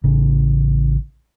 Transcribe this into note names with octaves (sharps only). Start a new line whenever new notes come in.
A1 C#3